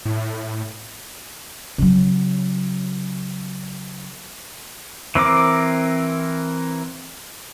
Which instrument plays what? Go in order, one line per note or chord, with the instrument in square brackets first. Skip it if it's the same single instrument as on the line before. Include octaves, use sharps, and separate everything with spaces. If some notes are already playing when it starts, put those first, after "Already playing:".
[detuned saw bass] A2
[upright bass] C#3 F#3
[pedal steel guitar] E3 C4 A#4 D6